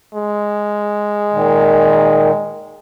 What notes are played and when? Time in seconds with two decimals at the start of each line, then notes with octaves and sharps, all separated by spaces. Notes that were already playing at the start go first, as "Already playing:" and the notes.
0.14 G#3
1.32 A#2 D#3